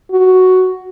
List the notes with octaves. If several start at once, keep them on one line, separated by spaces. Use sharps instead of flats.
F#4